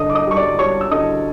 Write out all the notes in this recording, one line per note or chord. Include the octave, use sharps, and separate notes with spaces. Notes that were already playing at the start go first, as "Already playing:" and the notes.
Already playing: G2 D3 D#5 D#6
D6
D#5 D#6
G3 C#6
D5 D6
G3 C#5 C#6
E6
D3 D#5 D#6